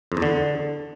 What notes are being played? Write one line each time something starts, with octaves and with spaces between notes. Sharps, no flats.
F2
E2
D3